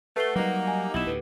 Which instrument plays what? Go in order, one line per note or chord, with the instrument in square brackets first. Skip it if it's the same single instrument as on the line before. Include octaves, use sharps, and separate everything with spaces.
[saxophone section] A3 [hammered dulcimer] F#4 [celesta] B4 C7 G7
[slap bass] F#3 G3 [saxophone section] A#3 D#4 [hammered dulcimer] G4 F#5
[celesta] G#5
[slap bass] B1 [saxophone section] B2 D#4 E4 [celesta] E7 F#7
[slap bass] D2 A2 [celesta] B4